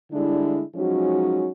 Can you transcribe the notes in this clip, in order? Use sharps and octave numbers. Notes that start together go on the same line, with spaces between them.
D3 G3 G#3 D4 E4
F3 F#3 G#3 C#4 D#4 F#4